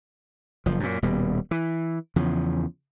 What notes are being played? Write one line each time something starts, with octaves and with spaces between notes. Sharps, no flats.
F#1 F3
F#2 A#2
D#1 B2 G3
E3
E2 C#3 F3